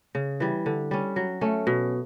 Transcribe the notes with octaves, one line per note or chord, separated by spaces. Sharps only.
C#3
E3 G3
D3
G3 C#4
F#3
A3 C#4
B2